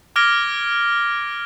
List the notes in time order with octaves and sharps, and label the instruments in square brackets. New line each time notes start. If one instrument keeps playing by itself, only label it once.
[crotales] D6 F6 G#6 A#6 D7 G7